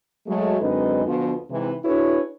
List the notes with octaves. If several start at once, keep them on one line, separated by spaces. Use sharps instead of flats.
F#3 G#3 A3
F#2 D3 G#3 C4 D#4 B4
D2 B2 F3
G#2 C3 E3
D4 E4 F#4 G#4 B4 C#5